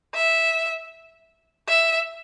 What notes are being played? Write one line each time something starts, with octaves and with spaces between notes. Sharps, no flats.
E5
E5